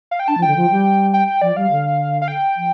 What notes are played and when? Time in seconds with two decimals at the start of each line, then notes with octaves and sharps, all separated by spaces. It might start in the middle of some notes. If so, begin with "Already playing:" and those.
0.11 F5
0.20 G5
0.28 D4 A5
0.38 F3
0.42 D3 G5
0.56 F3
0.71 G3
1.14 G5
1.28 G5
1.42 F3 D5
1.56 G3 F5
1.71 D3
2.22 F5
2.28 G5
2.56 F3